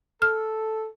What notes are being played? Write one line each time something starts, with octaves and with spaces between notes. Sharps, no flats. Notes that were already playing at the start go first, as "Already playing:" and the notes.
A4 F6